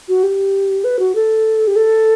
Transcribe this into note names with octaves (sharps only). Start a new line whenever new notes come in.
F#4
G4
B4
F#4
A4
G4
A4